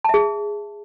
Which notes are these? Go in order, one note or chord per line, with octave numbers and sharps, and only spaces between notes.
G#4 E5 A5